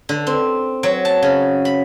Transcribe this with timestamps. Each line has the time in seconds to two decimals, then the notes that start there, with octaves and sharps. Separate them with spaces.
0.09 D3
0.27 C4
0.83 F#3
1.05 A5
1.23 C#3
1.65 B5